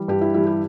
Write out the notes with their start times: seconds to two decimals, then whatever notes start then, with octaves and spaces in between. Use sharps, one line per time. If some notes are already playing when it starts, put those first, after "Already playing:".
Already playing: E3 G3
0.08 G2 G4
0.21 E4
0.34 E3 G3 E4
0.47 G4